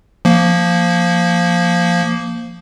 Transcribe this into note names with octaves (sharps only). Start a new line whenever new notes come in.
F3 A#3